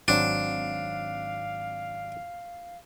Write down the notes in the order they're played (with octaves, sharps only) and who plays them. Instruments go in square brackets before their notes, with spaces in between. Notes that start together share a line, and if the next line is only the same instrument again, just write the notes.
[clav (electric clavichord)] G#1 F#3 C4 [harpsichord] D4 [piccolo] F5